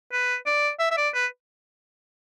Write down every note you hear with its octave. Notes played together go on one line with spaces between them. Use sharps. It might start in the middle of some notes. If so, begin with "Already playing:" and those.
B4
D5
E5
E5
D5
B4